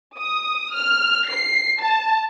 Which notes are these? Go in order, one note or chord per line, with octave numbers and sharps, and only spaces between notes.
D#6
F6
C7
A5